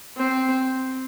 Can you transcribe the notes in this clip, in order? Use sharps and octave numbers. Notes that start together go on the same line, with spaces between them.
C4